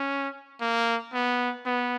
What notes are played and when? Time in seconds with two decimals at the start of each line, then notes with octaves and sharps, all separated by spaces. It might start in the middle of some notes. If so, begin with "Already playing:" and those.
Already playing: C#4
0.61 A#3
1.13 B3
1.66 B3